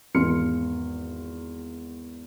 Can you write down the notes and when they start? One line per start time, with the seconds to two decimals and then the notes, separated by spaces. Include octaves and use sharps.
0.15 G#1 E2 C6 F6 C#7